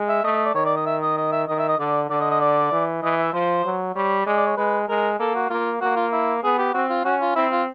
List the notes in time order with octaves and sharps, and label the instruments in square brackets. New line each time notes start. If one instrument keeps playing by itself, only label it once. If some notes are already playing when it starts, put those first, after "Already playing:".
Already playing: [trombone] G#3
[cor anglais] E5
[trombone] A3 [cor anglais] D#5
[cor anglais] D#5
D5
[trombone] D#3 [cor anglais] C#5
[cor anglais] D5
D#5
E5
D#5
D#5
E5
[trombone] D#3 [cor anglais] D#5
[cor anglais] E5
D#5
[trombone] D3 [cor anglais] D5
[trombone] D3 [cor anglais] D5
[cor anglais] D#5
D#5
D5
[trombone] E3
[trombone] E3 [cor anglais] D#5
[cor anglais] E5
[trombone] F3 [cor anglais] C5
[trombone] F#3
[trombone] G3 [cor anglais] C#5
[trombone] G#3 [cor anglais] D5
[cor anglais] D5
C#5
[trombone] G#3 [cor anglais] B4
[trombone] G#3 [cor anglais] A#4
[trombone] A#3 [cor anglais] A4
[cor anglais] F#4
[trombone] A#3 [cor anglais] F4
[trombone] A#3 [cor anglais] F#4
[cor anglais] F4
E4
[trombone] B3 [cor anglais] G#4
[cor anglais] G4
[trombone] C4 [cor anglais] F#4
[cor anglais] F4
[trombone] C#4 [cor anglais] F#4
[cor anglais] F4
[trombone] C4 [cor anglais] E4
[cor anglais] F4